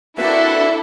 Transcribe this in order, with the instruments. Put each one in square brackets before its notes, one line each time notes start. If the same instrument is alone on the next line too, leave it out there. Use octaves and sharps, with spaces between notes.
[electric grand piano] A#3 C4 B4 [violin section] D4 E4 A4 [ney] F#4 [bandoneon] E5